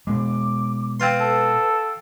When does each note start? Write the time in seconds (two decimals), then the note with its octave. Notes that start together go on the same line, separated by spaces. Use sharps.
0.07 B2 G#3 D6
1.00 C4 F4 B4 C6
1.20 A4